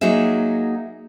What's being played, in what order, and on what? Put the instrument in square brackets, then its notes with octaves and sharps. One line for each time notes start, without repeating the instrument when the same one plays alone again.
[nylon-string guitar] F#3 A#3 D#4 F#4 G#4 E5